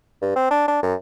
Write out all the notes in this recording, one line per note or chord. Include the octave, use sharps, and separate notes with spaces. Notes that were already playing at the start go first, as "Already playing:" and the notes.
G2
C4
D4
D4
F#2